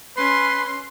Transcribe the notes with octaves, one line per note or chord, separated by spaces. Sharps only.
C#4 B4 C6